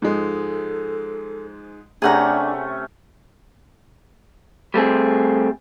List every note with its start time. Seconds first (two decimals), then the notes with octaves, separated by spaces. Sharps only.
0.02 G#2 F3 G#3 A4
2.02 C3 A3 C#4 D4 G#4 F#5 A#5
4.74 G3 A3 C4 G#4